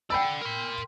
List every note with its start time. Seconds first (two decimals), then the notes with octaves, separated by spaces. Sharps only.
0.10 D5 F#5 G5 B5 E6
0.41 A#4 C6